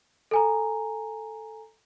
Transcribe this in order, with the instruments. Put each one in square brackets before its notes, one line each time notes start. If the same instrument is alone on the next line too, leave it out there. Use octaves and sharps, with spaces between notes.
[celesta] A4 G#5 A#5